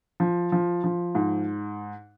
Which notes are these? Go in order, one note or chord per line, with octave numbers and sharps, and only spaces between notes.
F3
F3
F3
G#2